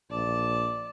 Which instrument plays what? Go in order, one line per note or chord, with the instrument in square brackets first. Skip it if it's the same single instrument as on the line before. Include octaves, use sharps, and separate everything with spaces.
[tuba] A#1 [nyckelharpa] D5 A5